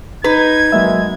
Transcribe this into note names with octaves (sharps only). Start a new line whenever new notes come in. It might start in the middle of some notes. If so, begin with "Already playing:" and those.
D#4 B4 G#6
F#3 G#3 A#3 E5